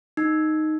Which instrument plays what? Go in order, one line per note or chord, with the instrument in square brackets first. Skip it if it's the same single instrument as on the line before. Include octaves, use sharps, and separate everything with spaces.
[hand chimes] D#4